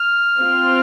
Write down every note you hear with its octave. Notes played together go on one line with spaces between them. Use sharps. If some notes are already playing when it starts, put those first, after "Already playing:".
Already playing: F6
C4 F4